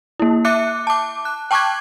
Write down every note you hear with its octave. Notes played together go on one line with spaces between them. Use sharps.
A#3 E4
E5 D6 F#6 C#7
A5 D6
F#6
G5 A5 C#6 D6 F#6 G#6